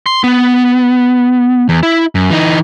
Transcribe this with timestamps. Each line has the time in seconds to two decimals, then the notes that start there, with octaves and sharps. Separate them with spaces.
0.06 C6
0.24 B3
1.69 E2
1.83 E4
2.15 F#2
2.30 E3 D#4